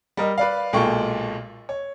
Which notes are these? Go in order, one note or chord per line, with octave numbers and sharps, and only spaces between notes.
G3 A#4 D#5
B4 D5 F5
B1 A#2 G#3 A4 G5 C#6
C#5